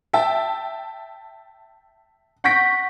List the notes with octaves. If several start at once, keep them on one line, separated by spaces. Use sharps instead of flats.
E5 G5 A5
F#5 C#6 G6 A#6 B6 D7